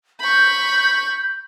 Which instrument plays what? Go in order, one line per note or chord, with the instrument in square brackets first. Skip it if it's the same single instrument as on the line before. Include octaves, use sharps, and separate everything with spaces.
[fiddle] B5 C#6 [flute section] G6